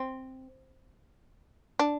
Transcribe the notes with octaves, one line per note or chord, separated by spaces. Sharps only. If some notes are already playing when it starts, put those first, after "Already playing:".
Already playing: C4
D4